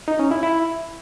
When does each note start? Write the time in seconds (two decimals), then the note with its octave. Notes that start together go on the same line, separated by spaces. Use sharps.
0.08 D#4
0.19 C#4
0.31 E4
0.43 E4